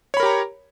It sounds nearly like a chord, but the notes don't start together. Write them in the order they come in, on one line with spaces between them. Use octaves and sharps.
C#5 B5 A#4 G4 A#5